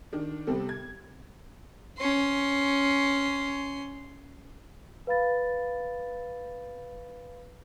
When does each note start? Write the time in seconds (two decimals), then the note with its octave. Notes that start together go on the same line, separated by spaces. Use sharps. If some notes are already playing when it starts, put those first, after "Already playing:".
0.13 D#3 D4
0.47 C3 G3 B3 C4 A4
0.69 G#6
1.98 C#4 C6
5.07 B4 F5 B5 A6